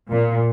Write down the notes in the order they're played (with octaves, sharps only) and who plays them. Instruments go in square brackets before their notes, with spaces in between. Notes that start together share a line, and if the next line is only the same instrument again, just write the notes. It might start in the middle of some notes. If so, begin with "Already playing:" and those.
[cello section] A#2